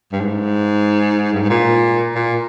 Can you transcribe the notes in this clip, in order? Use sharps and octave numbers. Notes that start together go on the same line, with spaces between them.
G2
G#2
G2
G#2
A#2
A#2